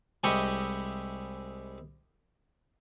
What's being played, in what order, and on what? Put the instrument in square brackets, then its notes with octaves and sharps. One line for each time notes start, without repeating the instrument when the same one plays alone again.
[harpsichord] C2 G#3 E4 G4 D#5 C#6